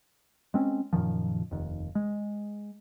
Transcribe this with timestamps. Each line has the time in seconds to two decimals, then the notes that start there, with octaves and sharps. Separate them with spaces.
0.54 G#3 C4 C#4
0.93 F#2 A#2 D#3 F3
1.51 F1 D#2
1.95 G#3